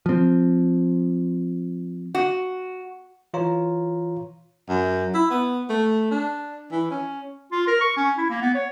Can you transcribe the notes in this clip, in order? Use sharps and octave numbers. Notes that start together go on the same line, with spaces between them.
F3 C4
F#4
E3 F4 C#5 A#5
F#2
E4
B3
A3
D4
E3
C#4
F4
A#4
C#6
C#4
E4
A#3
B3
C#5